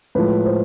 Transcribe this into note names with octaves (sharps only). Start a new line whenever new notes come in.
A2 F3 G#3 B4
C5